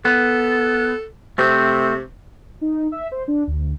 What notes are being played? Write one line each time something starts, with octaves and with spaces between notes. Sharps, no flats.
B3 A4
C3 A3 C4
D#4
E5
C5
D4
D2